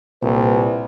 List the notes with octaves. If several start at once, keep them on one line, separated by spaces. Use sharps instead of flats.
C2 A#2 B4